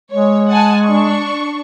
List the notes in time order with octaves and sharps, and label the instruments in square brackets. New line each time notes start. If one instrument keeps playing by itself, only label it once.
[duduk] G#3 [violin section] C#5
[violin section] F#5 G#5 A5
D4 C#6